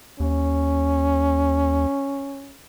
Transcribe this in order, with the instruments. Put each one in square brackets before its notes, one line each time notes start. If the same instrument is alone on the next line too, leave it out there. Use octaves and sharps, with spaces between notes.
[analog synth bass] D#2 [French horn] C#4